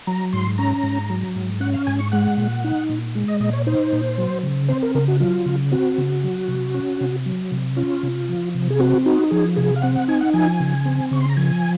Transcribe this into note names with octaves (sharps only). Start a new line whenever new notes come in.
F#3 A#5
G#2 C6
C#4 A#5
G#2
F#3
G#2
C#4 F#5
F5
G#2 G#5
C#6
G#3 F#5
A#2
D#4
A#2
G#3
D#5
A#2 D#5
C#5
D#4 C5
A#2
F#3
C#3
C4 C5
A#4
C#3 A#4
F#4
F#3 F4
C#3
C4 F#4
C#3
F#3
C3
C#4
C3
F#3
C3
C#4 F4
C3
F3
C3
G#4
C4 F#4
D#4 F#4
F3 G#4
C3 G#4
F5
C4 F#5
F#5
D#4 G#5
F#5
F3 G#5
C#3
C4
C#3 C#6
C6
A#5
F3 G#5